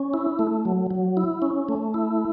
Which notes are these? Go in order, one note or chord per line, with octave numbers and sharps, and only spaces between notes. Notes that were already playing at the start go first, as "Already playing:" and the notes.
Already playing: C#4
E4
A3
F#3
F#3
E4
C#4
A3
E4